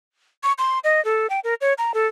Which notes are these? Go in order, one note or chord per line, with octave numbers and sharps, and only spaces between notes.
C#6
C6
D#5
A4
G5
A#4
C#5
A#5
A4